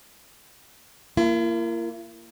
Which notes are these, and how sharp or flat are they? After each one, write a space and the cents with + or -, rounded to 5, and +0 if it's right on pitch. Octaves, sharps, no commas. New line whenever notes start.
A#3 -10 E4 +45